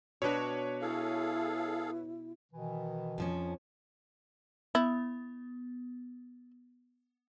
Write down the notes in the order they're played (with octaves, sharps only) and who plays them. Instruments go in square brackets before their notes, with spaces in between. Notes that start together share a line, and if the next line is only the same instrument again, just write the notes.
[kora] B2 D4 [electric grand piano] F#4 B4 C#5
[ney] E4 [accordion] G#4 A4 F5
[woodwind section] B2 D#3 E3
[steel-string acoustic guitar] F2 F3 C#4
[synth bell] B3 [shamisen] E4